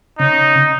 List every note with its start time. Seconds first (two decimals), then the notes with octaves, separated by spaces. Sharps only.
0.19 C#3 D#4